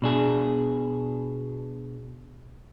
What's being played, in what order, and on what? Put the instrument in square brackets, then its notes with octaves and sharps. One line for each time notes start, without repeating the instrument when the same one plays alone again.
[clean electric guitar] B2 D4 G#4